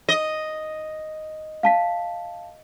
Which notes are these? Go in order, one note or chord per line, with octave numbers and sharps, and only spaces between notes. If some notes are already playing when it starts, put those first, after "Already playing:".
D#5
F5 A5 B6